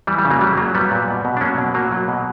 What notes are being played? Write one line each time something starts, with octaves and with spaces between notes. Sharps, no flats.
E3 G3
G3
C#3
F#3 A#3
F#3 G3
F#3 A#3
F#3 G3 B3
A#2
B2
B2
D4
F#3 A#3 C#4
B2
F#3 A#3
F#3
B2